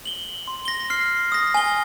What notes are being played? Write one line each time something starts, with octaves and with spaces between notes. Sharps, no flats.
F#7 G7
C6
A#6 G7
F6 C7
D#6 A#6
G#5 G7